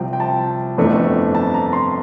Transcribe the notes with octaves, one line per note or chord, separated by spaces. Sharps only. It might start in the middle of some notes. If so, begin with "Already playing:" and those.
Already playing: C2 C3 F3 C4 G5
G5
A5
G1 F2 E3 A3 D4
A5
A#5
C6